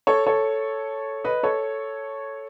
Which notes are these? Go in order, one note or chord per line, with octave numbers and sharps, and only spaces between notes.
A4 C#5
A4 C#5
B4 D#5
A4 C#5